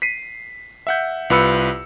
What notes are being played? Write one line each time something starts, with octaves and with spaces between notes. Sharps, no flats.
B6 C7 D#7
E5 F#5 G6
C2 F4 B4 B5 E6 C#7